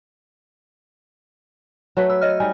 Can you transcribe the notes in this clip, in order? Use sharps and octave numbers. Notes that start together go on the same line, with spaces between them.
F#3 A3 B4
B4 E6
C#5 D#5 F6
G3 D#4 D#5 G#5